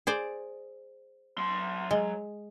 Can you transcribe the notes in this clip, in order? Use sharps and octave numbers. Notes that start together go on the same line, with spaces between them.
G#4 C5 D5
F#3 C6
G#3